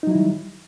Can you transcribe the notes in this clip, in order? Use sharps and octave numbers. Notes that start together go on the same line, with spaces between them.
D#3 F#3 G3 D#4 E4